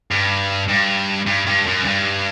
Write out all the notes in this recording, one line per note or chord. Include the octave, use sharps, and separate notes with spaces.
G2
G2
G2
G2
F#2
G2